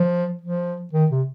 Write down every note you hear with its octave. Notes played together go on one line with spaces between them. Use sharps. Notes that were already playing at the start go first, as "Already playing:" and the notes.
Already playing: F3
F3
D#3
C3